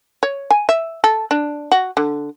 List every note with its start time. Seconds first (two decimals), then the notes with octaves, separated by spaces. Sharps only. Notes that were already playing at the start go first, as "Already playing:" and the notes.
0.23 C#5
0.51 G#5
0.69 E5
1.04 A4
1.31 D4
1.72 F#4
1.97 D3